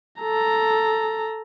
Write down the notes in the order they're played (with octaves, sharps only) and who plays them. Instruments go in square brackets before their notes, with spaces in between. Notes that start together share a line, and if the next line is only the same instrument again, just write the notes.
[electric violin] A4 A#5